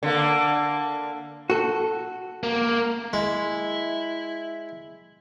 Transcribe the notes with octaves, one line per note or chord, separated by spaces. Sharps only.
D3 A#3
F#4 A4
A#3
G#3 E4